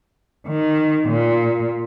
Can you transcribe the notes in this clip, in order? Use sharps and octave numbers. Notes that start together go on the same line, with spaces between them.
D#3
A#2